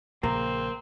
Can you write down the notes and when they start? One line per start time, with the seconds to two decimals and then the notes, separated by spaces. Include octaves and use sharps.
0.23 A#1 C#3 A#3 C4